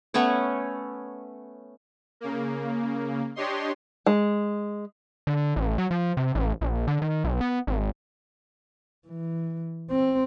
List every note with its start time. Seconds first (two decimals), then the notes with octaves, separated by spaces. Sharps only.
0.14 A3 B3 C#4 C#5
2.20 C#3 A#3
3.35 D4 G4 C#5 D#5 C6
4.06 G#3
5.27 D3
5.56 A1
5.78 F#3
5.91 F3
6.17 C3
6.35 A1
6.61 A#1
6.87 D3
7.02 D#3
7.24 B1
7.41 B3
7.67 G#1
9.08 E3
9.91 C4